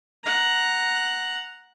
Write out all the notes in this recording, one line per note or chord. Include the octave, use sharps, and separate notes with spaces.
F#5 A#5